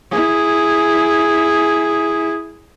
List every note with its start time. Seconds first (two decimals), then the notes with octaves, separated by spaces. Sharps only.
0.11 E4 G#4